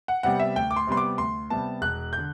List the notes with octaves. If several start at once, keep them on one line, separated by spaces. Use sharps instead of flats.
F#5
C3 G3 B3 F#5
E5
D2 G5
D6
C6
C3 G3 B3 C6
D6
D2 C6
C3 G3 B3 A5
E1 F#6
D3 G6